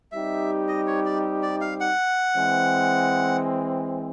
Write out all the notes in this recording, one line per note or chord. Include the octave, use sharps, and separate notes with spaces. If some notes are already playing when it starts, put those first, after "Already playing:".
G3 C4 D#4 G4 E5
D#5
C#5
D5
D5
F5
F#5
E3 G#3 C4